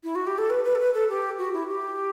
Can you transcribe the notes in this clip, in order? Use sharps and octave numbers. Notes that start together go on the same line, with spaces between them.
E4
F#4
G4
A4
B4
B4
A4
B4
A4
G4
F#4
E4
G4